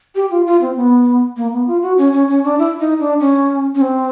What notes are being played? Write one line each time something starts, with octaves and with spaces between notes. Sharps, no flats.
G4
F4
F4
C4
B3
A#3
B3
F4
F#4
C#4
C#4
C#4
D4
E4
D#4
D4
C#4
C#4
C4